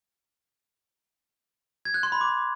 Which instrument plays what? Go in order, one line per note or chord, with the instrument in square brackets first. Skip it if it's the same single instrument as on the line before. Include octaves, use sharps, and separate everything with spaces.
[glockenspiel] G#6
F#6
C6
B5
D6